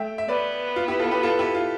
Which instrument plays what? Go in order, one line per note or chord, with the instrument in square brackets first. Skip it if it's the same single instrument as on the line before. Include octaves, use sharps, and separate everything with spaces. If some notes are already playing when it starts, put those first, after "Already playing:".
Already playing: [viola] A3 [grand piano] E5 G5
[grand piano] E5
[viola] B3 [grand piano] B4 D5
[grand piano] F4
E4 G4
F4 A4
G4 B4
F4 A4
E4 G4
F4